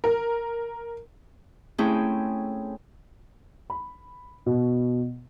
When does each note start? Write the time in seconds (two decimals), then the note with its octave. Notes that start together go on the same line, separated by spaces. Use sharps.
0.04 A#4
1.78 A3 C4 C#4 E4 G#4 G5
3.70 B5
4.46 B2